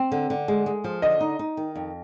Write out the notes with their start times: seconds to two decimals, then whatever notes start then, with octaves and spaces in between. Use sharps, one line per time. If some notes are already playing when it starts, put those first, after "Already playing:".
Already playing: C4
0.12 D3
0.30 D3
0.48 G#3
0.66 G#3
0.84 F3
1.02 D3 D#5
1.20 D#4
1.39 D#4
1.57 D#3
1.76 F2